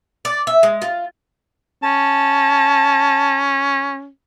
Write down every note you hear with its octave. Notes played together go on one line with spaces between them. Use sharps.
D5
E5
G#3
F4
C#4 A5